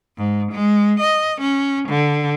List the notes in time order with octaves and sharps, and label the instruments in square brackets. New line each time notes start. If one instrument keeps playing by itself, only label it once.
[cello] G#2
G#3
D#5
C#4
D3